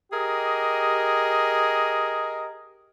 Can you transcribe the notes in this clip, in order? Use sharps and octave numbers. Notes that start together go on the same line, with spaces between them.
G4 G#4 A#4 D#5